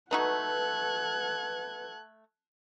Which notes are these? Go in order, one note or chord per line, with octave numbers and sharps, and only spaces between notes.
A3 D#4 F#4 A4 B4 F#5 F#6 G#6